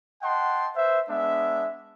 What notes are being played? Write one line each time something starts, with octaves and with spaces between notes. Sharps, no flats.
D#5 F#5 G5 A5 C6
B4 C5 E5
G#3 B3 D4 E5